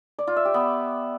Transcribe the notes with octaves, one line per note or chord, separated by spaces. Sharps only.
D5
F4
E5
G4
B3